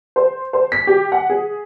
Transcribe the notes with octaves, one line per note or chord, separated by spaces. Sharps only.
C5
C5
B6
G4
F#5
G#4